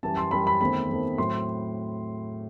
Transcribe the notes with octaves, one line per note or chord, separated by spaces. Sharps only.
F#2 E3 G3 A5
C6
F#2 E3 G3 B5
B5
E2 D#3 A3 C4 B5
E2 D#3 A3 C4
A2 F#3 C4 C6